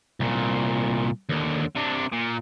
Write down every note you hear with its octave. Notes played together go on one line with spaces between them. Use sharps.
C2 A#2
D#2 D3
C3 D4
A#2